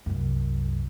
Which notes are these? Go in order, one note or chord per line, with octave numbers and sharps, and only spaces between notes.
C2 F#2